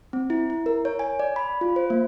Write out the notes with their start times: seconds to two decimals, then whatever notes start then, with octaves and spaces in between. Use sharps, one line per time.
0.13 C4
0.30 E4
0.50 E4
0.66 A#4
0.85 C#5
0.99 G#5
1.19 D5
1.36 B5
1.61 F4
1.76 C5
1.90 A#3